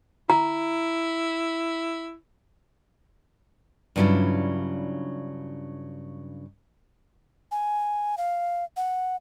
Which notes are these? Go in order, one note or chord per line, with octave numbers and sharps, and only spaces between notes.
E4 A#5
G2 C#3 F#3 D4 E4 F4
G#5
F5
F#5